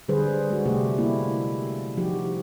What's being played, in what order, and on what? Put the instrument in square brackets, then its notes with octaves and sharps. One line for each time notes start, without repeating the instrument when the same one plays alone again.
[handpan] D3 G3 G#4 B4 C5
G#3 F#4
C3 G3 A3 G4
A#3 C4 E4
F3 D#4 F#4 G4